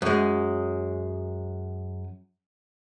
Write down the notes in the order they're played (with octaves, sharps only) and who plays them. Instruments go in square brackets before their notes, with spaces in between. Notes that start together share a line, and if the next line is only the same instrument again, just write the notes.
[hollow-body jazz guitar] F#2 G#3